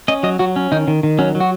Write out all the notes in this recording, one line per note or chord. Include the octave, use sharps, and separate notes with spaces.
C#4 D#5
F#3 D#5
F#3 F#4
C#4
D#3 D#4
D#3
D#3
F#3 C#4
F#3
F#4